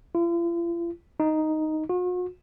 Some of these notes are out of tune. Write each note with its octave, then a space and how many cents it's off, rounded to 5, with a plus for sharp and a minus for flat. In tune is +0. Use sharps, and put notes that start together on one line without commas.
F4 -45
D#4 +0
F#4 -45